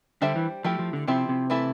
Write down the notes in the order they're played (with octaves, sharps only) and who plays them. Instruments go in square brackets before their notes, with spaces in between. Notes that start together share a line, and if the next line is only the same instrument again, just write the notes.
[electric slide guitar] D3 [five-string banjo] G3 D4 G4 C5 E5
[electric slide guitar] E3
[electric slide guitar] F3 [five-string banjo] A3 E4 G4
[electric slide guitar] F3
D3
[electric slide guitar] C3 [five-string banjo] F3 C4 E4 G4
[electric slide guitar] C3
[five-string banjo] E3 A3 E4 A4